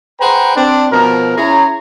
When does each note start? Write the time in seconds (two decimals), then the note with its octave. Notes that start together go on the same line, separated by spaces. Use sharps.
0.20 G#4 B4 C5 F#5 G5 A#5
0.56 C4 D4
0.92 B2 F3 A#4
1.37 C#4 E4 G#4 C#5 A#5